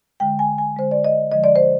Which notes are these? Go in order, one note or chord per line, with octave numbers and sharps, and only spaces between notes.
D3 G#3 G5
G#5
G#5
D3 G#3 C5
D5
D#5
D3 F3 G#3 D#5
D5
C5